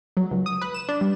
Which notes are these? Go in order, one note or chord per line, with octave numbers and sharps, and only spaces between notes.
F#3
C#2
D#6
B4
E7
D4
G3